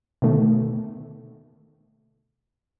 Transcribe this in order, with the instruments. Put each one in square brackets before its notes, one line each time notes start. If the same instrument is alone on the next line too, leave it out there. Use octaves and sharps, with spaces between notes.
[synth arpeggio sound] B2 D3 D#3 A3